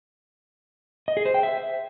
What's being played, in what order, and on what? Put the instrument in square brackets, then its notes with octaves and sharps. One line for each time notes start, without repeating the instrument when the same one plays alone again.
[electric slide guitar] D#5
G#4
C5
G5
E5